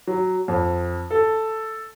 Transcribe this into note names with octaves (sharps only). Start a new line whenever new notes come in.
F#3
F2
A4